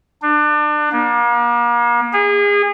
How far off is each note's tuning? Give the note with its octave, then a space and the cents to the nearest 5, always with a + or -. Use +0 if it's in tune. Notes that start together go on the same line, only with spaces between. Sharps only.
D4 +30
A#3 +40
G#4 -30